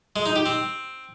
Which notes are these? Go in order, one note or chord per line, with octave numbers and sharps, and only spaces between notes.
G#3
D#4
G4
C4